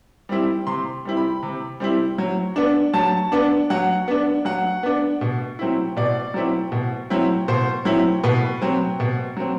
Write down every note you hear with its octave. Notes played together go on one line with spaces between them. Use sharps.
G3 C4 E4
C3 C6
G3 C4 E4
B5
C3
G3 C4 E4
F#3
B3 D4
F#3 A5
B3 D4
F#3 F#5
B3 D4
F#3 F#5
B3 D4
B2
F#3 C4 E4
B2 D5
F#3 C4 E4
B2
F#3 C4 E4
B2 C5
F#3 C4 E4
B2 B4
F#3 C4
B2
F#3 C4